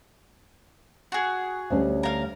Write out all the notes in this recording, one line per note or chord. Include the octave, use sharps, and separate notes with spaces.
F#4 G#4
D2 G3 C#4
A#4 F5